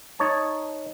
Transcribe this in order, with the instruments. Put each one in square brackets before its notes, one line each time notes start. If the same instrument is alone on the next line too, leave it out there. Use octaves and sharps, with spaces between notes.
[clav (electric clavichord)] D#4 C#5 A5